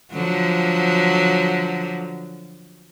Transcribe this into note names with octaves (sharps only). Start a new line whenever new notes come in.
D3 F3 F#3